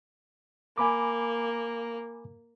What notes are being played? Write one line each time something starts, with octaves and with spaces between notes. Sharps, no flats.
A#3 G#5 B5 D6